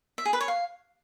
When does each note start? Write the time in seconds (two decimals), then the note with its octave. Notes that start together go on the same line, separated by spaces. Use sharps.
0.18 E5
0.25 G#4
0.33 B4
0.41 C#5
0.48 F5